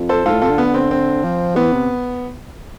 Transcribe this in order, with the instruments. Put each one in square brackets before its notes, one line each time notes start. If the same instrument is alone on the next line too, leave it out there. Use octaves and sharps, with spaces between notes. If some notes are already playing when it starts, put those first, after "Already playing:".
Already playing: [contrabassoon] F2
[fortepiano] A4 C5
[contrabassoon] G#2 [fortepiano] F4 A4
[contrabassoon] A2
[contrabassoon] C3 [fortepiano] F4 A4
[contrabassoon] D3
[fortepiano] B3
C4
C4
[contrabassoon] F3
[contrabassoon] E3 [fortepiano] B3
[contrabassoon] C3